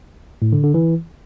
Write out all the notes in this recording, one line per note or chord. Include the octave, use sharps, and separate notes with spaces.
A2
D3
D3
E3